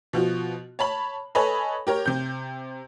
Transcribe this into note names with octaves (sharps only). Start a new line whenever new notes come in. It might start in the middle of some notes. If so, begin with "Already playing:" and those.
B2 F3 F#4
C#5 A5 B5 F#7
A4 B4 C#5 D#5 G#5 B5
G4 A#4 C#5
C3 G6